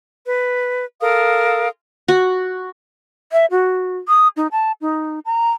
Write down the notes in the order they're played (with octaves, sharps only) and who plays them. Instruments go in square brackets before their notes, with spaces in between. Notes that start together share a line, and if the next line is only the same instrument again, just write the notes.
[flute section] B4
A4 A#4 F5 D#6
[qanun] F#4
[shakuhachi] E5
F#4
D#6
D#4
A5
D#4
A#5